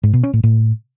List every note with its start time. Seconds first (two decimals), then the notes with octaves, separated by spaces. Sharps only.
0.03 G#2
0.13 B2
0.23 C#4
0.33 A2
0.43 A2